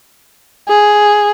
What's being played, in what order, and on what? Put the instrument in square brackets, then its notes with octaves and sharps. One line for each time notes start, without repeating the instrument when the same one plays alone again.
[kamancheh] G#4